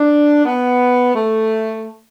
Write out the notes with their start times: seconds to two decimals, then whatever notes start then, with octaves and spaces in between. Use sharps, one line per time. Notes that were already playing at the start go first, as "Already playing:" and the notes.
Already playing: D4
0.46 B3
1.14 A3